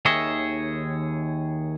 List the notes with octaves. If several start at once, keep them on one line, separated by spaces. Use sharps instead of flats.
D#2 D#3 G#4 C#5 D#5 E5